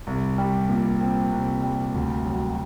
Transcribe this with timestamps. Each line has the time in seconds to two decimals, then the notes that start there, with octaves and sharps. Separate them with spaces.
0.07 C2
0.38 G3
0.69 A#2
1.01 C4
1.32 C2
1.63 G3
1.95 D2
2.26 F#3